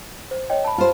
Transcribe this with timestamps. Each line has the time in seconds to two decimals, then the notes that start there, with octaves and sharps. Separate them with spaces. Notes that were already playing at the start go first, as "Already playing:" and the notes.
0.31 C5
0.50 C#5 D#5 G5
0.64 A5 B5
0.78 F4 C5